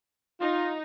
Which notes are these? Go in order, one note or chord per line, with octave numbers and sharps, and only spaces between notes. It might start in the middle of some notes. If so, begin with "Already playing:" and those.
D#4 F4